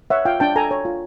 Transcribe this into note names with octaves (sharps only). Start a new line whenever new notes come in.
C#5 E5 F#5
F4 F5 G5
D4 G5 A5
A4 G#5 A#5
C#5
F4